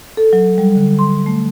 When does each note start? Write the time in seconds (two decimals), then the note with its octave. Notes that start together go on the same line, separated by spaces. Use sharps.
0.17 A4
0.33 F#3
0.58 G3
0.75 D3
0.99 C6
1.26 A3